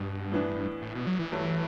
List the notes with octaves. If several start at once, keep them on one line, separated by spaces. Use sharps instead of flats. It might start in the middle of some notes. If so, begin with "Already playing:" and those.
Already playing: G2 B2
A2 E3 B3 D4
A2
B2
F#3
E3
G2 F#3 A3